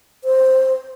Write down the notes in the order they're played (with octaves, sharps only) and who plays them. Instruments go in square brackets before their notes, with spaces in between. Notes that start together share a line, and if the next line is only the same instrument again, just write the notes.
[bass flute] C5